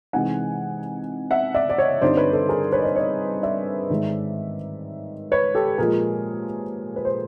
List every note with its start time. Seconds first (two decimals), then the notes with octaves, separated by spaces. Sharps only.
0.13 C3 E3 G#3 C4 D#4 F#5 G#5
1.31 E5 F#5
1.54 D5 E5
1.70 D5
1.78 C#5 D#5
2.02 G2 D3 G3 C4 D#4 C5 D5
2.17 B4 C#5
2.33 A4 B4
2.49 G#4 A#4
2.72 B4 C#5
2.79 D#5
2.84 C5 D5
2.96 C#5 D#5
3.43 D5 E5
3.90 G#2 D#3 G#3
5.32 B4 C#5
5.55 G4 A4
5.78 A#2 F3 G#3 G#4 A#4
6.96 B4
7.05 C5